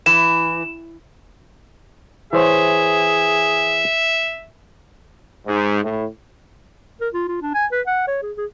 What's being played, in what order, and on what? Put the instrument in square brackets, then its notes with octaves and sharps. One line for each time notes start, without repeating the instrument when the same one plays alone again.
[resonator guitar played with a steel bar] E3 [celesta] E7
[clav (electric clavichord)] E3 C5 C#5 [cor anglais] G#4 [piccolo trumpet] E5
[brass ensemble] G#2
A2
[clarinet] A#4
F4
F4
D4
G#5
B4
F#5
C#5
G#4
G#4